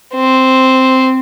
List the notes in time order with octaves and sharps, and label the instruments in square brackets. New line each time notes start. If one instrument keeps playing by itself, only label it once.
[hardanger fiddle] C4